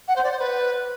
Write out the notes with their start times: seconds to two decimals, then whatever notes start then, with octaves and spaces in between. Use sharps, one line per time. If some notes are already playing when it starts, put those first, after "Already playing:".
0.08 F#5
0.15 C5
0.23 D5
0.31 C5
0.39 B4